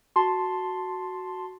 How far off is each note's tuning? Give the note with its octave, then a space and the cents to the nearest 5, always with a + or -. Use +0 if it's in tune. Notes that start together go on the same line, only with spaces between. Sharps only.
F#4 +0 A5 +0 C6 +0